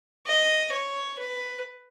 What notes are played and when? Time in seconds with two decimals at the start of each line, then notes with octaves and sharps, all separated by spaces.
0.26 D#5
0.72 C#5
1.19 B4